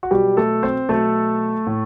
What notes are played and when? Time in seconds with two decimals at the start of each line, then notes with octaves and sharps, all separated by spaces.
0.03 F#4
0.11 B2 F#3 G3 G4
0.37 A3 A4
0.63 C4 C5
0.89 B2 F#3 A3 A4
1.67 A2